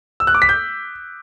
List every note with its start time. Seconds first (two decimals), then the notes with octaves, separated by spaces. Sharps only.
0.20 E6
0.27 F#6
0.35 D6
0.42 B6
0.49 G6